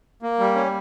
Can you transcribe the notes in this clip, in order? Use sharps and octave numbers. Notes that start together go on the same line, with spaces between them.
A#3
G3
C#4